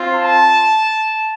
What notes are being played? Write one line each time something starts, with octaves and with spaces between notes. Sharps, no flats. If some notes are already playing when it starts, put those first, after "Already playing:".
Already playing: C4 F4
A5